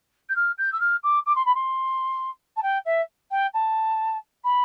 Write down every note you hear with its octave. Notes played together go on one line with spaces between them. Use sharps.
G6
F6
G6
E6
F6
D6
D6
C6
B5
C6
A5
G5
E5
G5
A5
B5